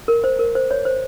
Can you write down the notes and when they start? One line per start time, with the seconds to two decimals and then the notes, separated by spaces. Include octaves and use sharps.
0.08 A#4
0.24 C5
0.39 A#4
0.55 C5
0.71 C#5
0.85 C5